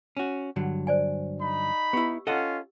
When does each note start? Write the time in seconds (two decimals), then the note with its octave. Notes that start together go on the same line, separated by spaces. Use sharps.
0.17 C#4 F#4
0.56 G2 D3 F#3
0.87 C5 D5 G#5
1.40 D#4 B5
1.93 B3 E4 G4 E6
2.27 C#4 F4 A4 D#5 F#5